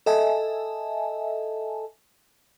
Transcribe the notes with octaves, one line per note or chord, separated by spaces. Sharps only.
A4 D#5 E5 G#5 A5